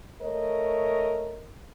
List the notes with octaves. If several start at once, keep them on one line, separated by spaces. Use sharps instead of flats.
A3 A#4 C#5 D#5